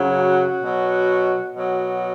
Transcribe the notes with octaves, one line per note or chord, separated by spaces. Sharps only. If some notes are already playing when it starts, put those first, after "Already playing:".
Already playing: F#2 C#3 F#3
F#4
B2 F#3
B2 F#3